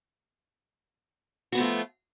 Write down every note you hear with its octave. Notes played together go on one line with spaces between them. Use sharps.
F3 A3 B3 F4 F#4